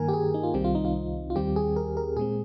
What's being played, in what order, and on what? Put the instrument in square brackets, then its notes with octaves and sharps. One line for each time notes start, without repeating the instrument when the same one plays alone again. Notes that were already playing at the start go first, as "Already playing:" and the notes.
Already playing: [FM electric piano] G2 D#3 A#3 A#4 G#5
G4
G#4
G4
D#4
F4
C2 C3 D#3 G3 C4 G4
F4
D#4
F4
F4
D#2 D#3 G3 C4 G4
G#4
A#4
A#4
A#2 G#3 C4 G#4